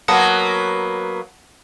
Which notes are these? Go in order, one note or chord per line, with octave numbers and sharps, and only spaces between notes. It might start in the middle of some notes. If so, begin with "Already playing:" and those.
F#3 A#3 B3 F#5 A5 D#6